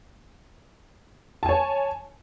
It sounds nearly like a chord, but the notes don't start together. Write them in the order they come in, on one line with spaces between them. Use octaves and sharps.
A5 G#5 C#5